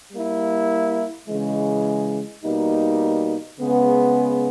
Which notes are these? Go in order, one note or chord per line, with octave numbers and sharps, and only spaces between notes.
G3 A#3 E4
C#3 E3 G#3
B2 G3 A#3 D#4
C#3 G#3 B3